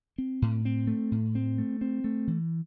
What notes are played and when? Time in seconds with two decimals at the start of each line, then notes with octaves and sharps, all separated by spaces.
0.18 C4
0.42 A2
0.65 C4
0.87 A3
1.11 A2
1.35 C4
1.58 A3
1.81 C4
2.04 A3
2.27 E3